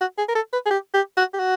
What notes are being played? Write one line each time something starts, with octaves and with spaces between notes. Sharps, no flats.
F#4
G#4
A#4
A4
B4
G#4
G4
G4
F#4
G4
F#4